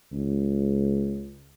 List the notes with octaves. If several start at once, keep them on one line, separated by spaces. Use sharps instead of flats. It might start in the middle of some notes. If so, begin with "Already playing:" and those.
C#2